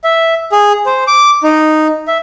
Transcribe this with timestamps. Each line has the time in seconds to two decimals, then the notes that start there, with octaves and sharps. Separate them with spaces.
0.04 E5
0.52 G#4
0.86 C5
1.07 D6
1.43 D#4
2.08 E5